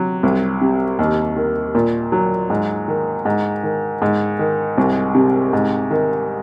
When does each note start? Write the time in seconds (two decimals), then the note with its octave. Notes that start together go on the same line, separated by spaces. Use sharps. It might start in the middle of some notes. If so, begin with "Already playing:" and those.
Already playing: C3 F#3
0.23 C2
0.61 C3
0.99 D#2
1.37 D#3
1.75 A#2
2.12 F#3
2.50 G#2
2.88 D#3
3.25 G#2
3.63 D#3
4.02 G#2
4.39 D#3
4.78 C2
5.15 C3
5.53 G#2
5.90 D#3